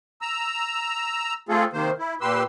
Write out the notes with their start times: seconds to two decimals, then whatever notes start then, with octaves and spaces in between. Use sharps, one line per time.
0.22 A#5 E6
1.49 A3 C4 F4 G#4 A4
1.73 C3 D#3 A#3 C5
1.98 E4
2.21 A#2 G4 B4 C6 E6